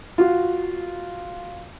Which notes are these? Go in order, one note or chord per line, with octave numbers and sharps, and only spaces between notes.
F4 F#4